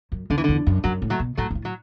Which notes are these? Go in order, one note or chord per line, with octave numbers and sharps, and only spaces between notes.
F#2
E2 D3
E3
E2 D3
F#2
F#2 F#3
A2
F#3 A3
B2
A2 F#3 A3
G2
A2
F#3